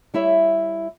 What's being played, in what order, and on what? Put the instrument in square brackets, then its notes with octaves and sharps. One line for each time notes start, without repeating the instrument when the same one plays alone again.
[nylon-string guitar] G3 E4 C#5 E5